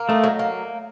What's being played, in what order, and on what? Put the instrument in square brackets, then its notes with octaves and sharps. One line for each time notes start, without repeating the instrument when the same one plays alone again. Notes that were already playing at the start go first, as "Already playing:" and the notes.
Already playing: [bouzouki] A#3
[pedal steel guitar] A3 [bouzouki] D#4
[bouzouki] F#3
A#3